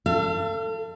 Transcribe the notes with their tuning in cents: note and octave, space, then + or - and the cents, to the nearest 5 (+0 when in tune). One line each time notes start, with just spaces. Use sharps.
A4 +25 F5 -40